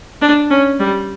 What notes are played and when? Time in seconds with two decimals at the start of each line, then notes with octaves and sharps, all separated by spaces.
0.22 D4
0.51 C#4
0.80 G3